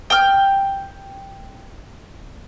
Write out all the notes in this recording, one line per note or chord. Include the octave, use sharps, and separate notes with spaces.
G5 F6